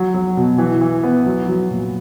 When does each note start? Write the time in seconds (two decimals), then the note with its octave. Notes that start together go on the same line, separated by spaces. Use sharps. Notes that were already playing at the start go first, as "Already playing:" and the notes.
Already playing: F#3
0.14 F#3
0.37 B2
0.58 E3
0.81 E3
1.03 B3
1.26 F#3
1.48 F#3
1.71 A#2